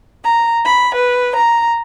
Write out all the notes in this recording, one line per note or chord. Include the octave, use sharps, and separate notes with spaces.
A#5
B5
B4
A#5